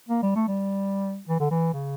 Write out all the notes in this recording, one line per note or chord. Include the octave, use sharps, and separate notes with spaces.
A#3
G3
A3
G3
E3
D3
E3
C#3